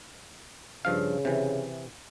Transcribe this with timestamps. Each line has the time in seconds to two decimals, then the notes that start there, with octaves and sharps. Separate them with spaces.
0.85 G2 C#3 F3 F5
1.25 C3 E3